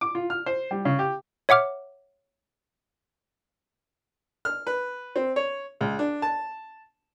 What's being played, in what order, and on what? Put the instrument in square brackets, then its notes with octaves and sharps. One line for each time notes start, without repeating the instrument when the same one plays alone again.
[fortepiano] D6
F4
F6
C5
G3
C#3
G4
[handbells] C#5 E5 F#5 D6 F6
[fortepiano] F6
B4
C4
C#5
C#2
D4
A5